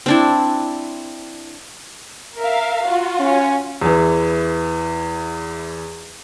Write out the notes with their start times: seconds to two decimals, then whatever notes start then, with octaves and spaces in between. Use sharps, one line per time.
0.06 C4 D4 E4
2.39 A#4 E5 F5
2.87 F4 F#4
3.20 C#4
3.82 E2 E3